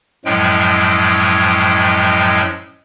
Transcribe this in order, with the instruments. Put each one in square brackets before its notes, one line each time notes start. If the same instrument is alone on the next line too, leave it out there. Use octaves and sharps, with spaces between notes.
[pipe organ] F#2 A2 F3 F#3 G#3 G5